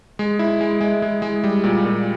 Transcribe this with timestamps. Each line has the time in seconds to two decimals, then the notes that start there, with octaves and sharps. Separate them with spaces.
0.19 G#3
0.39 E4
0.61 G#3
0.81 G#3
1.02 G#3
1.22 G#3
1.44 G3
1.64 A#2
1.85 A#2